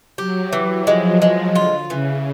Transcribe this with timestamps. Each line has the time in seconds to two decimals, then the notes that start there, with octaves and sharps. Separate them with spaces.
0.18 F#3 G4
0.53 E3
0.87 F3 G#3
1.22 G#3
1.55 D3 F4
1.90 C#3 E3